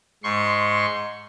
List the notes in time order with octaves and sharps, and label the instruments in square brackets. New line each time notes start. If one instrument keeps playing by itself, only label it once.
[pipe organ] G#2 C6 C#6